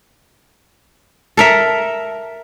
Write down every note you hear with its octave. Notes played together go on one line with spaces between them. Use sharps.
A4 A#4 E5